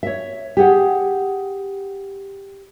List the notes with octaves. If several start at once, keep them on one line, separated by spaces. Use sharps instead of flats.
C#5 E5
G4 G#4 F#5